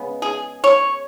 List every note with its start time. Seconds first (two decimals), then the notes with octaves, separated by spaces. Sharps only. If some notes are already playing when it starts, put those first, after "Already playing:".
Already playing: C#3 G#3 B3
0.22 G#4
0.64 C#5